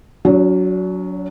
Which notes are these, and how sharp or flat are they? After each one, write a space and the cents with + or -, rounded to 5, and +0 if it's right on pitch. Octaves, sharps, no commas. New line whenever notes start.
F#3 +0 D4 -45